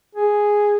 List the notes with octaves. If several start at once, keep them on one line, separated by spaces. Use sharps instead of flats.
G#4